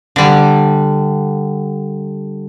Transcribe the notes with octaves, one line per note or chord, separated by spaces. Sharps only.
D3 G3